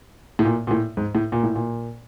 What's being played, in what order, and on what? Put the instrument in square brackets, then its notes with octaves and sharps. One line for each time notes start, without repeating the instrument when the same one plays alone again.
[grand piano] A2
A#2
A#2
A2
G#2
A2
A#2
A2
A#2